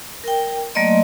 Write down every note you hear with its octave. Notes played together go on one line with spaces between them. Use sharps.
A#4 G5
F#3 A3 A#3 D5 D#5 C6